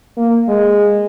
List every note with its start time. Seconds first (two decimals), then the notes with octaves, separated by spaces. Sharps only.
0.17 A#3
0.49 G#3